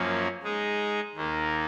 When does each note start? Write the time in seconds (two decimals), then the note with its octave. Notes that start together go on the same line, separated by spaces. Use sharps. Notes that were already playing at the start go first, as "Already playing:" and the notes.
Already playing: F#2 F3 A#3 C#4
0.43 G#3 D#4 G#4
1.15 D#2 D#3 A#3